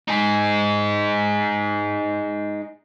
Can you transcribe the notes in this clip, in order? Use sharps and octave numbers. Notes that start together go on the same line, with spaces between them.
D#4 G#4